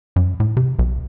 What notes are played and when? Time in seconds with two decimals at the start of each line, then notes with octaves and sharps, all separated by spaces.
0.16 F#2
0.40 A2
0.57 C3
0.79 B1